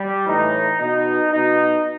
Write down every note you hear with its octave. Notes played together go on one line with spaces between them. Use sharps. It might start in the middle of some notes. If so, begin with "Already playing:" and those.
Already playing: G3
A2 E3 D#4
B2 D#4
B2 D#4